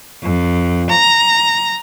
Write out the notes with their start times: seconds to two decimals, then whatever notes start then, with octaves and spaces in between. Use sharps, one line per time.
0.22 F2
0.90 A#5